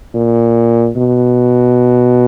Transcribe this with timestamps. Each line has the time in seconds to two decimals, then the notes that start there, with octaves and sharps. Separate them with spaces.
0.14 A#2
0.96 B2